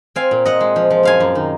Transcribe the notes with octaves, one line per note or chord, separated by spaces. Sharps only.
C4 F5 G#5
A#2
A#2 D#5 F#5
G#3
F3
F3
F#2 F5 G#5
F#2
D#3